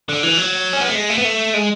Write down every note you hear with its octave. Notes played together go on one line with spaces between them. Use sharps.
D3
E3
F#3
C#4
B3
A3
G#3
A3
B3
A3
G#3